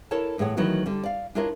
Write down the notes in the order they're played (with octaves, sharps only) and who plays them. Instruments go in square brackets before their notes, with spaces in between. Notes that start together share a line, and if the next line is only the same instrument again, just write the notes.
[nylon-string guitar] E4 A4 A#4 C#5 A5
E2 A2 G#4 C#5 F#5
D#3 E3 F#3 A3 B3 F#4
D3 G3
D5 F5
D4 E4 F4 A#4 C#5 D#5